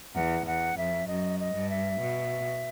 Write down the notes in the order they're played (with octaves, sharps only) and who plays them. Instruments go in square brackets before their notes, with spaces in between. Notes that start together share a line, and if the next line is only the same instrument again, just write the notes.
[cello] E2 [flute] F#5
[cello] E2 [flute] F#5
[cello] F2 [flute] E5
[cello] F#2 [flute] D#5
[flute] D#5
[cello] G2
[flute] E5
[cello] B2